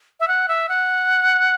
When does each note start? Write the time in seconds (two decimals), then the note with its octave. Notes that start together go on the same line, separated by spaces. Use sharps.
0.20 E5
0.28 F#5
0.48 E5
0.69 F#5